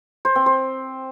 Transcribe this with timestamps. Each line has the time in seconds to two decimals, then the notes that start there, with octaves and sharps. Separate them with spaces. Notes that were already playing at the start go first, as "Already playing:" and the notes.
0.25 C5
0.35 C4
0.46 C5